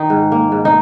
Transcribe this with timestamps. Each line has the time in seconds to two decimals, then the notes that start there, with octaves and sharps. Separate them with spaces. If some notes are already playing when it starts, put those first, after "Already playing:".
Already playing: D#3 D#4
0.10 G#2
0.32 A#3
0.52 G#2
0.65 D#4